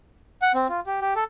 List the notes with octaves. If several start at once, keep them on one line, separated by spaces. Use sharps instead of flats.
F#5
C4
F4
G4
G4
A4